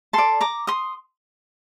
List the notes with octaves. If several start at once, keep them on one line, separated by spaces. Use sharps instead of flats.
A4 D5 A5 C6
A#5 D6
C6 D#6